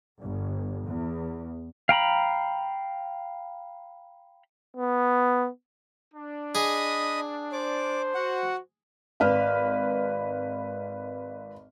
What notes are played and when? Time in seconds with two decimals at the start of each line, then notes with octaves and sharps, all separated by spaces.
0.21 G1
0.86 E2
1.89 F5 G5 A#5 B5
4.77 B3
6.14 D4
6.55 G#4 D#5 B5 D#6
7.53 C5 D5 D6
8.14 F#4 F#5
9.20 G#1 B4 D5 F5 F6